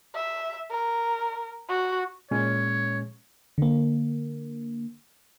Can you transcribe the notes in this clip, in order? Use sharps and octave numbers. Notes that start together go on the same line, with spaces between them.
E5
A#4
F#4
A#2 G#3 C#4 C#5
D3 A#3